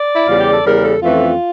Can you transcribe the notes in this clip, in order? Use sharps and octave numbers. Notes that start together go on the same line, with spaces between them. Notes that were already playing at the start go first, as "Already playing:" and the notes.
Already playing: D5
E4
E2 C#3 G3 F4
G4
A4
E2 C#3 G3 A#4
A4
F2 E3 A3 C#4 F4